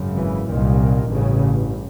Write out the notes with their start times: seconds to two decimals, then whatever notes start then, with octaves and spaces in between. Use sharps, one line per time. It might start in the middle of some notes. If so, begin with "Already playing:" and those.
Already playing: G#1 F#2 C#3
0.17 E3
0.48 C2 A#2 D#3
0.79 D#3
1.10 A1 G2 C#3